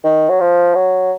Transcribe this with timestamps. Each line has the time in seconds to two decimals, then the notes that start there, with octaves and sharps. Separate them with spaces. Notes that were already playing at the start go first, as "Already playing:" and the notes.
0.04 D#3
0.29 F#3
0.40 F3
0.75 F#3